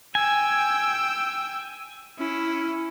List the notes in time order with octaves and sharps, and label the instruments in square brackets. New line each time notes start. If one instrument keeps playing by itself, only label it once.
[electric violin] G5 E6 [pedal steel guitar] G#5
[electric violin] C#4 E4